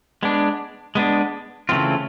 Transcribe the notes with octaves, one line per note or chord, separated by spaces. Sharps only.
G#3 B3 D4
G#3 B3 D4
C#3 E3 A3 C4 F4